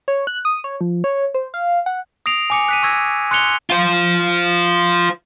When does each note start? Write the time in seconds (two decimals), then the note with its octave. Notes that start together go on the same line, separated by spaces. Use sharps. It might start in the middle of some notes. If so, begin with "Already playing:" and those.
0.08 C#5
0.27 F#6
0.45 D#6
0.64 C#5
0.81 F3
1.04 C#5
1.34 C5
1.54 F5
1.86 F#5
2.26 D#6 A#6 C7 D7 F7
2.50 G#5 D6 C#7
2.68 F#6 B6 D#7
2.83 C#6 E6 G#6 A#6 F7
3.31 C6 F#6 G#6 C#7 F7 G7
3.70 F4 C5